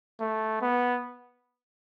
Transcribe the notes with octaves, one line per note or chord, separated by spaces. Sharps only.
A3
B3